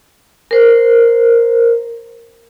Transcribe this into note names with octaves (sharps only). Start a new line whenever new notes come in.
A#4 C5